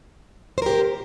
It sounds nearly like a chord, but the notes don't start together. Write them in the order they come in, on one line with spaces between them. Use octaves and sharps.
C5 A#4 G4